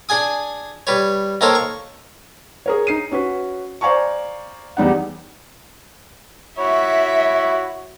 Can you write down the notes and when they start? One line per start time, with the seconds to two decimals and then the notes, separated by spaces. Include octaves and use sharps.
0.09 D4 G#4 G#5 D#6
0.87 G3 B4 C#5
1.41 D#3 A#3 D#4 A4 C5 C#5
1.55 C#6
2.66 G#4 A#4 C#5
2.87 D#4 C7 D#7
3.12 C#4 F#4 B4
3.81 C5 D5 F5 G#5 A#5 C#6
4.77 E2 G3 D#4 F#5
6.59 E4 F#4 C#5 E5